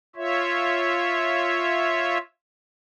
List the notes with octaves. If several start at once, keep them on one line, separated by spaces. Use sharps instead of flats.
F4 C#5 E5